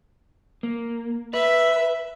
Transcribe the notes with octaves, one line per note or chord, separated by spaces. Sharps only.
A#3
B4 E5